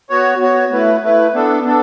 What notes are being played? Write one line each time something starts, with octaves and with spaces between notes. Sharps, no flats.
B3 F#4 C#5
B3 F#4 C#5
A3 E4 B4
A3 E4 B4
B3 D4 A4
B3 D4 A4